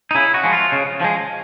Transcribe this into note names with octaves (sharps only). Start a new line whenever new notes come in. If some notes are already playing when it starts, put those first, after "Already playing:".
D#4
C#3 E4
F#4
F3 G#3
F4
C#3
F3 G#3